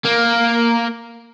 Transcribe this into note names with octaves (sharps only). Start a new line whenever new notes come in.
A#3